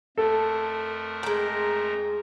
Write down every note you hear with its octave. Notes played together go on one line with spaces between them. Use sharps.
F2 A3 A4 A#4
G#3 G5 A#5